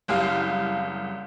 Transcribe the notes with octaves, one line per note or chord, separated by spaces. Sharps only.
F#1 C2 G4 F5